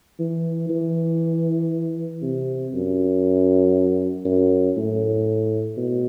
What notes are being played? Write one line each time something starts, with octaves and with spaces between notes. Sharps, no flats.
E3
E3
C3
F#2
F#2
A2
B2